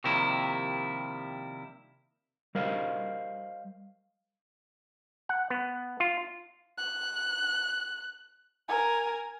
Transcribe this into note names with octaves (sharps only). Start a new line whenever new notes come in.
C3 D#3 F3 G3 A#3 E4
G3 A#4 C5 D#5 F5
F#5
B3
F4
F#6
A#4 G#5